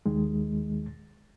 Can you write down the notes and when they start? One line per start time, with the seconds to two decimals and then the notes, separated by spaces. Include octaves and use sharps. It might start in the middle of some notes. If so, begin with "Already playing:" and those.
0.06 D#2 D#3 G#3